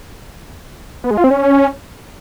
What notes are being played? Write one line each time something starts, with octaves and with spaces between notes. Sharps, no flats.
B3
G#3
F4
C4
C#4